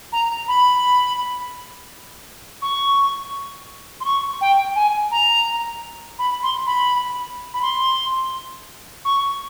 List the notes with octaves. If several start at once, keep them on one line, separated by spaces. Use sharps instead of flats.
A#5
B5
C#6
C6
C#6
G5
G#5
A#5
B5
C6
B5
B5
C6
C#6